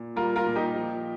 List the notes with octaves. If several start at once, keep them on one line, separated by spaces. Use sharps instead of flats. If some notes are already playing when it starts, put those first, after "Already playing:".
Already playing: A#2
G3 F4 A#4
F4 A#4
A#2
D#4 G4
F3